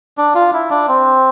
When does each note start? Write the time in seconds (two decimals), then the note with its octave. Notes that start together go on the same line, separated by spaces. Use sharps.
0.18 D4
0.35 F4
0.54 E4
0.70 D4
0.88 C4